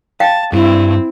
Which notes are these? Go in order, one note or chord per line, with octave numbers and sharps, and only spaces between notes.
F5 G5 A5
G2 C4 E4